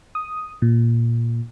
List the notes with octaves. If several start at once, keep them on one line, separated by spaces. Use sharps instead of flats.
D#6
A#2